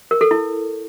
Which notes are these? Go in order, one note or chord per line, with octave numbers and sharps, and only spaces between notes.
A#4
A4
E4